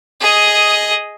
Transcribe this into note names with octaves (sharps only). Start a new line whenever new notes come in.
G#4 D#5